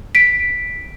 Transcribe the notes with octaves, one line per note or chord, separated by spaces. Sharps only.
B6 D7